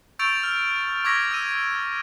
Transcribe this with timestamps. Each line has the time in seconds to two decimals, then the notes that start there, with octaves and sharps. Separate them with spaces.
0.19 C#6 E6 G6 A6 D7 F7
0.43 F6
1.04 C#6 D6 E6 G#6 A#6 B6
1.31 E6 D#7